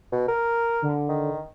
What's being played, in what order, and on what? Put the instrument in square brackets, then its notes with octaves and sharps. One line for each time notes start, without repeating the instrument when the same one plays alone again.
[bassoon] B2
A#4
[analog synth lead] D3
[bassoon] D#3